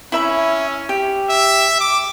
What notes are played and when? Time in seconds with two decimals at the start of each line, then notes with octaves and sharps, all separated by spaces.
0.12 C#4 E4 E5 B5
0.89 G4
1.30 E5
1.80 D6